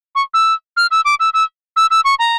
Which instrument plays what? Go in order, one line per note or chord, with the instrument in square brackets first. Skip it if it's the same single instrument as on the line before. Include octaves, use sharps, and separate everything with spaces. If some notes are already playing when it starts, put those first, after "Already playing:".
[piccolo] C#6
E6
F6
E6
D6
E6
E6
E6
E6
C#6
A#5